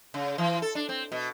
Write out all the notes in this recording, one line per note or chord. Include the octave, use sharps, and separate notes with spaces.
C#3
E3
A4
D4
C4
B2